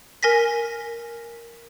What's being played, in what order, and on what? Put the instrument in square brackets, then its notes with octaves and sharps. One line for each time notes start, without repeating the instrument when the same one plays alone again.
[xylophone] A#4 G#5 A#6 B6